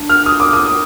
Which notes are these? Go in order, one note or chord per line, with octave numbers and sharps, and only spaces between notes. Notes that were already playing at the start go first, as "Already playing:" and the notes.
Already playing: D4
F6
D#6
D6
D#6